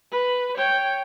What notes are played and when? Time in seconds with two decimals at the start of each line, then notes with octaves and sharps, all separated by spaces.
0.12 B4
0.58 C#5 G5